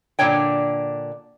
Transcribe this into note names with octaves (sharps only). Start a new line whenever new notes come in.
A#2 D3 D4 C#5 G5